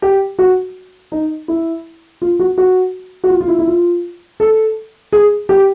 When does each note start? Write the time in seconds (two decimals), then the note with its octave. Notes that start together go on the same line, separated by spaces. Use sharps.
0.02 G4
0.39 F#4
1.12 D#4
1.48 E4
2.22 F4
2.39 F#4
2.58 F#4
3.24 F#4
3.30 F4
3.41 F4
3.48 E4
3.59 E4
3.67 F4
4.40 A4
5.12 G#4
5.49 G4